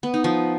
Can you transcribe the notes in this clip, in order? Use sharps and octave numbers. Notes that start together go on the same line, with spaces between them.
B3
D#4
F3